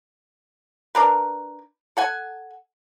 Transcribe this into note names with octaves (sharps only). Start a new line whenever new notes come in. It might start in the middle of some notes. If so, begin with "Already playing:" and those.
D4 A#4 B4
A4 F#5 G#5